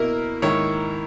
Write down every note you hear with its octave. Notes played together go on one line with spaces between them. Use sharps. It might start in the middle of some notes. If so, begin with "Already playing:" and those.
Already playing: B2 A#3 E4 A#4
G#2 D#3 A#3 E4 C#5